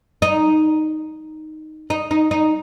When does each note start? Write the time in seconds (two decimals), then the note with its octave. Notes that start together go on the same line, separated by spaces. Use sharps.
0.22 D#4
1.90 D#4
2.11 D#4
2.31 D#4